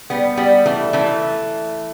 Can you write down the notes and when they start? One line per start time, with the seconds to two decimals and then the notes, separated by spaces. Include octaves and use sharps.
0.10 G3 B3
0.37 G3 B3
0.66 E3 A3
0.93 E3 A3